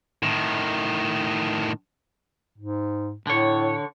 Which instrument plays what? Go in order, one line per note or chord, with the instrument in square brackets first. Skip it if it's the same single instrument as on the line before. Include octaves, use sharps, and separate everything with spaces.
[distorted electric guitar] A2 D#3
[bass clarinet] G#2
[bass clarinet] A2 [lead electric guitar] D3 C#5